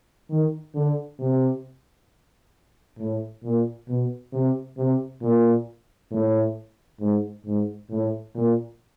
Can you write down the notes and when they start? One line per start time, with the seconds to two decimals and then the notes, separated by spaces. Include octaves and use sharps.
0.30 D#3
0.75 D3
1.19 C3
2.99 A2
3.43 A#2
3.88 B2
4.33 C3
4.77 C3
5.21 A#2
6.11 A2
7.00 G#2
7.45 G#2
7.90 A2
8.35 A#2